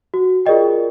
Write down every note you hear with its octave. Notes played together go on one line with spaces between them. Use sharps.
F#4
F4 G#4 A#4 D5 D#5 G5